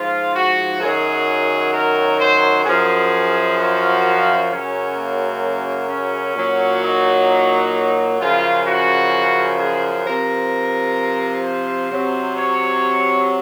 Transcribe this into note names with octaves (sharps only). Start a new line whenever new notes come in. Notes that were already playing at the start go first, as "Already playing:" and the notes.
Already playing: G#2 F3 F4
F#4
F#2 D#3 F#3 G#4
A#4
C5
F#2 F3 G#4
F#4
F#2 C#3 F#3 C#4
A#3
C#4
A#2 F#3
D#4
F#2 C#3 F3 F4
F#4
G#4
C3 F3 A#4
C5
C3 F#3
C#5